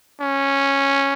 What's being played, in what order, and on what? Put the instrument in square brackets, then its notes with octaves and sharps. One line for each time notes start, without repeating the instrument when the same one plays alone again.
[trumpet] C#4